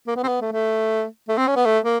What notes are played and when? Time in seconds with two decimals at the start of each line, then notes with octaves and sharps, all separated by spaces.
0.07 A#3
0.16 B3
0.23 C4
0.28 B3
0.41 A3
0.53 A3
1.29 A3
1.38 C4
1.47 C#4
1.56 B3
1.66 A3
1.84 A#3